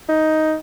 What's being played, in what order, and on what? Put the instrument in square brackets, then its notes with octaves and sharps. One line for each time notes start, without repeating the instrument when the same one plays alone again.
[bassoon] D#4